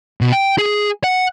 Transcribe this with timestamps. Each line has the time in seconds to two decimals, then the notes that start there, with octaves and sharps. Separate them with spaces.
0.21 B2
0.32 G5
0.58 G#4
1.04 F#5